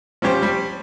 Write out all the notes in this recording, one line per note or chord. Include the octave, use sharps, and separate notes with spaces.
F3 G3 C#4 G4 C5
G3